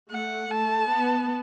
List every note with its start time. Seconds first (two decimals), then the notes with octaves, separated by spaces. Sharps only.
0.12 A3 F#5
0.51 A3 A5
0.90 B3